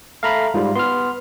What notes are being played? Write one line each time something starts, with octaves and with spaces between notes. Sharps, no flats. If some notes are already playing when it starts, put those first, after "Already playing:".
A3 F5 A#5 B5
G#2 G3 F4
B3 C6 F6